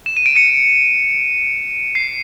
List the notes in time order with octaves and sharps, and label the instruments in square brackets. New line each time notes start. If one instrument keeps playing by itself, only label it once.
[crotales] E7
D#7
D7
C#7 D#7
C7